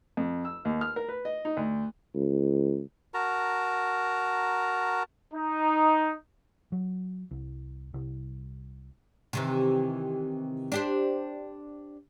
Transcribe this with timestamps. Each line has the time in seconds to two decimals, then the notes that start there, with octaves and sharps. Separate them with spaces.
0.17 F2
0.45 E6
0.65 D#2
0.81 F6
0.96 A#4
1.09 B4
1.25 D#5
1.45 D#4
1.57 D2
2.15 C#2
3.14 F#4 A#4 A5 A#5
5.33 D#4
6.72 F#3
7.31 C2
7.94 C2
9.33 C3 D#3 E3
10.72 D4 G4 C5